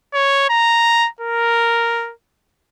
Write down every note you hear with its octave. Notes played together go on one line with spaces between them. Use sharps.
C#5
A#5
A#4